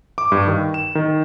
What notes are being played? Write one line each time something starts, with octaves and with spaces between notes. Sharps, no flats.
D6
G2
D#3
E7
D#3